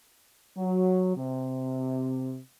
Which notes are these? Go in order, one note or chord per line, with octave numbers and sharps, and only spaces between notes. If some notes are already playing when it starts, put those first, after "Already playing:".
F#3
C3